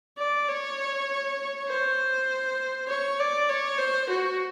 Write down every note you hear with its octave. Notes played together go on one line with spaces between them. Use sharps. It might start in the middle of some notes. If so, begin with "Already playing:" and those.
D5
C#5
C5
C#5
D5
C#5
C5
F#4